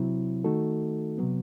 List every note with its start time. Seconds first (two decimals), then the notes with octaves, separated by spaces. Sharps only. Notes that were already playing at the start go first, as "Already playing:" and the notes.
Already playing: C3 F#3 C4 E4
0.44 D#3 A3 D#4 F#4 A4
1.18 C3 F#3 B3